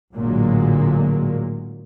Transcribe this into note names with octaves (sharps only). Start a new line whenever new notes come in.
A1 A#2 D3 F#3 G#3 A#3